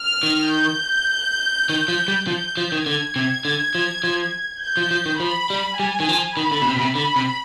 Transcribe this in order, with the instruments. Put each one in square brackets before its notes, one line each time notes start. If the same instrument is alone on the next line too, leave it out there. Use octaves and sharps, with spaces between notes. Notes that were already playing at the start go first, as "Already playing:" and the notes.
Already playing: [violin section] F6
[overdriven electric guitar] D#3
[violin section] G6
[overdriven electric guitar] D#3
F3
G3
[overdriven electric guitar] F3 [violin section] G6
[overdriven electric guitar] F3
D#3
[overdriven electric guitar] D3 [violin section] G#6
[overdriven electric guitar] C3
D3
F3
F3
[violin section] G6
[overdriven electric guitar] F3
F3
D#3
[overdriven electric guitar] F3 [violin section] B5
[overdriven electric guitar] G3
[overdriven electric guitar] G3 [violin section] G#5
[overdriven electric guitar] D#3
F3
[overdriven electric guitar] D#3 [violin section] B5
[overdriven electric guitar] D3
B2
C3
B2
C3
[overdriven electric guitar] D3 [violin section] B5
[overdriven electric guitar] C3